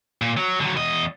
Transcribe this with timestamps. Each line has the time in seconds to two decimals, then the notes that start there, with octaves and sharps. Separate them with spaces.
0.22 A#2
0.37 F#3
0.60 D3 F#3
0.76 E2 D#5